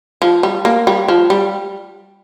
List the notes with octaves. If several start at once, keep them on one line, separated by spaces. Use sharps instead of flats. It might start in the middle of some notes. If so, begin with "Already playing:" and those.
F3
G3
A#3
G3
F3
G3